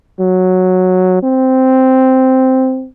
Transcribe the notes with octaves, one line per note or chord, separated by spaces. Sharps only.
F#3
C4